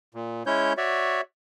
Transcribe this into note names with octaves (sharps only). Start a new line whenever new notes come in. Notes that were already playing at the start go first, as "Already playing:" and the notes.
A#2
G#3 C#4 E4 C#5 G6
F#4 C#5 D5 E5